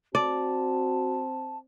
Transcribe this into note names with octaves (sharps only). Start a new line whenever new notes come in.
C4 F#4 D5 A5